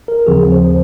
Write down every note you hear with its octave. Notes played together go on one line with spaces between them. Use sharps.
A#4
D#2 C#3 F3 C4 G#4
C5